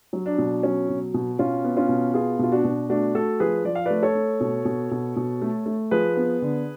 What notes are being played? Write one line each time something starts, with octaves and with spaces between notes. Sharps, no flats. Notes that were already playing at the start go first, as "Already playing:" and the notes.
F#3
D4
B2
F#3 C#4
B2
B2
B2 C#4 F4
B3
C#4 F4
B2
B3 F4 G#4
B2 F4
D4 F#4
B2
A3 D4 F#4
A3 F#4 A4
F3 G#4 B4
F3 D5
F5
A3 B4 D5
A4 C#5
A3
B2
B2
B2
B2
A3
A3
F3 G#4 B4
B3
D3